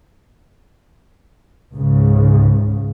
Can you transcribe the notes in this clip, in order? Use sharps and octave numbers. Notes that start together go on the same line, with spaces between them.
C#2 G#2 C#3